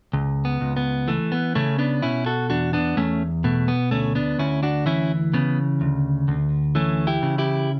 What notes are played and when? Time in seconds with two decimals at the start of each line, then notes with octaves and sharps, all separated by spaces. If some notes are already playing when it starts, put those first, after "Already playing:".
0.13 C#2
0.45 B3
0.61 C#2
0.77 B3
1.08 E3 A3
1.32 B3
1.55 C#3 A3 C#4
1.79 B3 D4
2.02 B2 C#4 E4
2.26 F#4 A4
2.50 E2 D4 F#4
2.73 B3 D4
2.97 E2 A3 C#4
3.44 B2 A3
3.68 B3
3.91 D2 A3 C#4
4.15 B3 D4
4.39 D2 C#4 E4
4.63 D4 F#4
4.86 E3 C#4 E4
5.33 C#3 B3
5.81 D2
6.28 D2
6.75 E3 A3 C#4
7.07 E4 G4
7.23 C#3
7.38 E4 G4